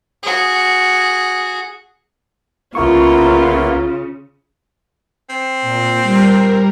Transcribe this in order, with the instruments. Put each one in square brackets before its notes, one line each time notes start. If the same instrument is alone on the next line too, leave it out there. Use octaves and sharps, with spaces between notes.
[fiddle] F#4 G#4
[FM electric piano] C2 C#6 [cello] C#3 [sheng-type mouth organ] A#3 B3 E4 [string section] F4
[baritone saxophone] C4
[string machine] A#2
G3 A#4